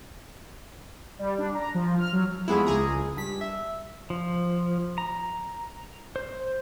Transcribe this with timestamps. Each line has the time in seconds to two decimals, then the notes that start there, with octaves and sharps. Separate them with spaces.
1.19 G3
1.38 D4
1.55 A#5
1.74 F3
1.99 F6
2.13 F#3
2.48 F2 G#3 B3 E4
2.67 C#2 G#4 A#5
3.17 G2 B6
3.41 E5
4.10 F3
4.98 A#5
6.16 C5